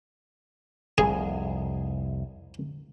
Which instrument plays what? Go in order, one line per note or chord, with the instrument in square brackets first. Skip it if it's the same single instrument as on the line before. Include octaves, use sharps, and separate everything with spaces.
[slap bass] F1 C2 [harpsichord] G#4